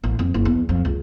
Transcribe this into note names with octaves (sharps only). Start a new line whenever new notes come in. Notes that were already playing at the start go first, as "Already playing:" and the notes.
A1
F2
F#1
E2
F2
C#2